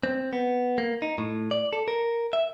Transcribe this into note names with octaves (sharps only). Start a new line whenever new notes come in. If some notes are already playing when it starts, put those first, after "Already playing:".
C4
B3
A#3
D#4
A2
D5
A4
A#4
E5